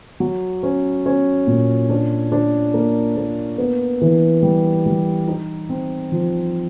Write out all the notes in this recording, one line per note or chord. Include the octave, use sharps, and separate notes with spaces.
F#3
C#4
C#4
A#2
D4
D4
A#3
A#3
B3
E3
G3
G3
D#4
C4
F3